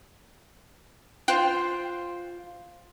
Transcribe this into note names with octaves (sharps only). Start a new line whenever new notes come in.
F4 C5 G5 F#6